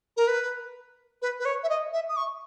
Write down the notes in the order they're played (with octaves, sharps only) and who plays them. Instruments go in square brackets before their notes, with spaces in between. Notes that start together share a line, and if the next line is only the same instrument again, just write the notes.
[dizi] A#4
B4
B4
B4
C#5
E5
D#5
E5
D#6
C#6